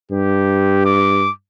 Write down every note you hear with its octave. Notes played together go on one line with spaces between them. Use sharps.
G2 G4
D6